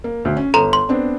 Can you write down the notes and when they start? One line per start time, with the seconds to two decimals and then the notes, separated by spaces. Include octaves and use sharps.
0.04 A#3
0.25 D2
0.37 C#4
0.54 G1 A4 A#5 C6
0.73 C6
0.89 B3 C4 D4